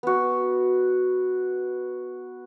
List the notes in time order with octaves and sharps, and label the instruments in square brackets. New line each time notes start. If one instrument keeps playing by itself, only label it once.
[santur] B3 F#4